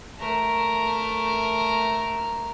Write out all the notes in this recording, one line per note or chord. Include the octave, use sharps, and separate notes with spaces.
A3 A#4